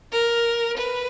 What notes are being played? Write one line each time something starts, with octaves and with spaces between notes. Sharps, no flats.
A#4
B4